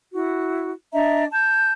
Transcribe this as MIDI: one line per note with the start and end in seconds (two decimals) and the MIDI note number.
0.13 0.71 64
0.13 0.71 66
0.93 1.24 62
0.93 1.24 75
0.93 1.24 76
0.93 1.24 82
1.32 1.72 81
1.32 1.72 91